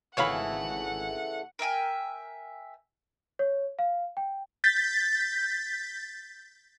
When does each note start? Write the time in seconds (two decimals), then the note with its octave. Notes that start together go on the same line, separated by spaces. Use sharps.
0.17 G#1 C#3 E3 A3 C#5 F5 F#5 B5
1.59 A#4 E5 G5 G#5
3.39 C#5
3.79 F5
4.17 G5
4.64 G6 A6 B6